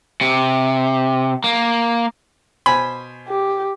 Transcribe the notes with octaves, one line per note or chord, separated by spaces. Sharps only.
C3
A#3
B2 C5 G#5 B5
G4